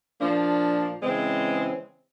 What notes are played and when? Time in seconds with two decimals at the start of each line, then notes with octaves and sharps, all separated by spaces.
0.20 A#2 F3 A#3 D4
1.02 C#3 E3 G#3 C4